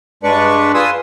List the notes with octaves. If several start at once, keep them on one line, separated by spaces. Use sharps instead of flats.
G2 G#3 D4 B4 D5 C#6
F4 B4 G#5 C6 D#6 E6